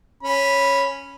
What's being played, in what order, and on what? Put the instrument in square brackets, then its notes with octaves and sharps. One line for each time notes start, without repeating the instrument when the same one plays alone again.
[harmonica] C#4 B5